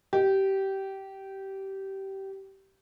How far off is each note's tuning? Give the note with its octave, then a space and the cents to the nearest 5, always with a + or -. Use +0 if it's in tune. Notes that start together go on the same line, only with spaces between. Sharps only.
G4 -20